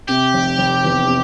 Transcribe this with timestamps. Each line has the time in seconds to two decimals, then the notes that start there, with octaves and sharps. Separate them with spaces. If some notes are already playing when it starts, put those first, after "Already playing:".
0.08 C3 G4
0.34 F1
0.58 F1
0.84 E2
1.08 C3